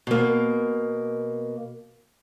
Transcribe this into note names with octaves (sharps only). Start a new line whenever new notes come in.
B2 A#3